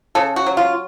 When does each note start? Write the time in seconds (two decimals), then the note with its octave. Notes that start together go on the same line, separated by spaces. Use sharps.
0.15 C#3 A4
0.36 F#4
0.46 F#3
0.57 F4